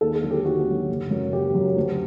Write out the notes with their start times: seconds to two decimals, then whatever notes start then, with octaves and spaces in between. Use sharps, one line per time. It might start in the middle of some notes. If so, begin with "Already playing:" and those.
0.01 D#2 A4
0.16 A4
0.23 D3 F#3
0.31 G4
0.45 D#2 F#4
0.67 D3 F#3
0.89 F#1
1.11 F#2 F#3
1.32 F#1 G4
1.54 F#2 F#3
1.76 D2